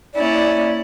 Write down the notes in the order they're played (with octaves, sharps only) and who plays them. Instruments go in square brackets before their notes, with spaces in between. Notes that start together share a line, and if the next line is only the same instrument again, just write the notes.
[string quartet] A#3 C#4 E4 [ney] D5